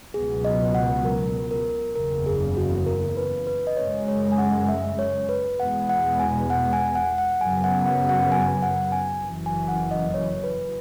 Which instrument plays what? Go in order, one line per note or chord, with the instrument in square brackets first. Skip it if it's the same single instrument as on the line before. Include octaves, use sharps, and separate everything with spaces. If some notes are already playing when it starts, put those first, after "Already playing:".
[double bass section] C#2 B2 F#3 B3 [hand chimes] G#4
[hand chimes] D#5
F#5
A#4
A#4
[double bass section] F#1 E2 C#3 [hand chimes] A#4
[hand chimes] G#4
F#4
A#4
B4
B4
D#5
[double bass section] F#2 C#3 G#3 [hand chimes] C#5
[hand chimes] C#5
G#5
F#5
E5
C#5
B4
[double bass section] E2 B2 G#3 B3 [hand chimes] F#5
[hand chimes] F#5
G#5
F#5
G#5
F#5
F#5
[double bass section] F#2 C#3 F#3 B3 [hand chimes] G#5
[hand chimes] F#5
F#5
F#5
G#5
F#5
G#5
[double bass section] F#1 F#2 E3
[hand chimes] G#5
F#5
D#5
C#5
B4